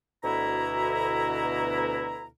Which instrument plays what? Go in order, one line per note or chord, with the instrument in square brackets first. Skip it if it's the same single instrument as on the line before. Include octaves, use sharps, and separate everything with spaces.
[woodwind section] D2 B2 E4 A#5